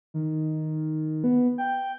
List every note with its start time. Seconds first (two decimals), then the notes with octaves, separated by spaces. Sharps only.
0.14 D#3
1.24 B3
1.58 G5